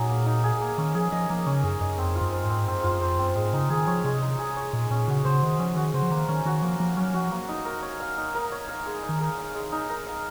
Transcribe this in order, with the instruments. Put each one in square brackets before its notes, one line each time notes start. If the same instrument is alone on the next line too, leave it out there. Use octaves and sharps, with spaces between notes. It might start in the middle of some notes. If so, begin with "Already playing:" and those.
Already playing: [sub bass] A#2 [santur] F#3 D#4 G#4
[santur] A#3
D#4
G#4
A#3
[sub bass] D#3 [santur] C#4
[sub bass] F3 [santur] G#4
[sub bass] F3 [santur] D#5
[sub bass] F3 [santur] A#3
[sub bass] C#3 [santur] C#4
[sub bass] F#2 [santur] G#4
[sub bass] F#2 [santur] D#5
[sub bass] F2 [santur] C4
[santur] F4
[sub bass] F#2
[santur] C5
[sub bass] G#2
[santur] C4
[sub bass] F#2 [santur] C4
[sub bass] F#2 [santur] F4
[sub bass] F2 [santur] C5
[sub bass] F#2 [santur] C4
[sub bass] G#2 [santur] G#3
[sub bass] C#3 [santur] D#4
[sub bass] D#3 [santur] G#4
[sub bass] F3 [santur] C#5
[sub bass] C3 [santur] G#3
[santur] D#4
G#4
C#5
[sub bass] A#2 [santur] G#3
[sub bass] A#2 [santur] C#4
[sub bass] C#3 [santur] F#4
[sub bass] C#3 [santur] C5
[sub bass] D#3 [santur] G#3
[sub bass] F3 [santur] C#4
[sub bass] D#3 [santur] F#4
[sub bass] C#3 [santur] C5
[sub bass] F3
[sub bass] D#3 [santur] A#3
[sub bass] D#3 [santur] C#4
[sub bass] D#3 [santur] F#4
[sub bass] F3 [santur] A#3
[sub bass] F3 [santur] A#3
[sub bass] F#3 [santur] C#4
[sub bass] F3 [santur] F#4
[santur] A#3
D#4
A#4
C#5
F5
D#4
A#4
C#5
F5
G#3
D#4
[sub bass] D#3
[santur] A#4
F5
G#3
D#4
A#4
F5